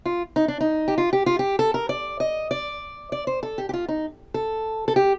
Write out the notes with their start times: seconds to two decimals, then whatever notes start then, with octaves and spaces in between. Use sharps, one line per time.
0.06 F4
0.36 D#4
0.48 D4
0.61 D#4
0.88 G4
0.98 F4
1.13 G4
1.26 F4
1.39 G4
1.59 A4
1.74 A#4
1.89 D5
2.20 D#5
2.51 D5
3.12 D5
3.27 C5
3.43 A4
3.58 G4
3.69 G4
3.74 F4
3.89 D#4
4.34 A4
4.88 A4
4.96 G4